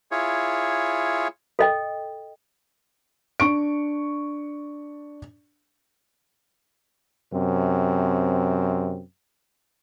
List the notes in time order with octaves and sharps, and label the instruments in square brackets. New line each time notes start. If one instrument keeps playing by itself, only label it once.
[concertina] E4 F4 G#4 C#5
[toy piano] A4 D#5 G5
[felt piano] D4 C#6 D7
[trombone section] F#2 C3 C4